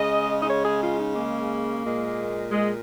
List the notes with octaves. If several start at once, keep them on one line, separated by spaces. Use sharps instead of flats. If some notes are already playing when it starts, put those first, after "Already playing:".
Already playing: C#3 G#3 D#5
D#5
C#5
G#4
F4
D#4
A#3
A#2 G#3
G#3